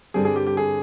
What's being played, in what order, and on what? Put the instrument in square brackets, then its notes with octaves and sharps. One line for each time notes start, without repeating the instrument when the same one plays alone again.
[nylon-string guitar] G2 D3 G3 C4 [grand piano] G#4
[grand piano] G#4
G4
G4
G#4